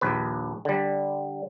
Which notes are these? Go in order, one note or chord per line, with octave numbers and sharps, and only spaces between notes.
A#1 D#2 B4
D3 G3